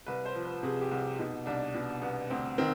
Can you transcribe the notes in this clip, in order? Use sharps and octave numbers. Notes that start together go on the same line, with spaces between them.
C2 B4
C5
F3
B4
C3 G#4
G4
C2
B2 D#4
C2 D4
B2
C2 B3
D2 C4
D#3 C4